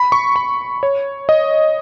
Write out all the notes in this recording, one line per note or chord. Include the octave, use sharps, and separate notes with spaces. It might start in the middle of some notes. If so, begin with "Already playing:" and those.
Already playing: B5
C#6
B5
C#5
D#5